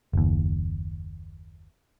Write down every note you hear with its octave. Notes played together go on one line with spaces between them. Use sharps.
F#1 D#2